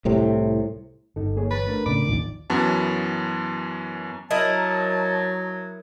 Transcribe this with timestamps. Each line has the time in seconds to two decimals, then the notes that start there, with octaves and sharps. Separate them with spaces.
0.05 C2 A2 C3
1.16 G1 D#4 A4
1.36 A#3 G#4 C#5
1.51 E3 B4 C#5 A6
1.67 A3 D4 A#4
1.86 A2 C#3 D5
2.06 A1 D#2 A2 D#3 F3 D#4
2.50 F#2 E3 B3 F#4 A5
4.31 F#3 E4 A#4 D#5 A5